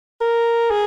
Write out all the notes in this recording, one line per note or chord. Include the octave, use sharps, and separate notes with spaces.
A#4
G#4